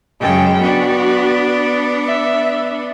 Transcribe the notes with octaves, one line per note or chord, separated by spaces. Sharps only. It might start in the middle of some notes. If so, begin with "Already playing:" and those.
F#2 C#3 G#3 G5
B3 D4 F#4
E5